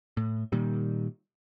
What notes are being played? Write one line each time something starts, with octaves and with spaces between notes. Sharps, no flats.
A2
A#2 D#3 G3